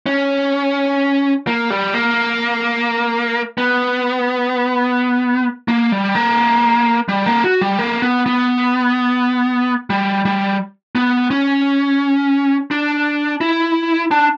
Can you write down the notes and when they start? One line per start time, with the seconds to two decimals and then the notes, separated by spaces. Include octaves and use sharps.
0.06 C#4
1.47 A#3
1.70 G3
1.94 A#3
3.58 B3
5.68 A#3
5.92 G3
6.15 A#3
7.09 G3
7.26 A#3
7.44 F#4
7.61 G3
7.79 A#3
8.02 B3
8.26 B3
9.90 G3
10.25 G3
10.95 B3
11.30 C#4
12.71 D4
13.41 E4
14.11 D4